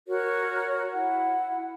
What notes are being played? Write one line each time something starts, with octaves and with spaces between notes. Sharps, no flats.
F#4 A#4 C#5
E4 F#5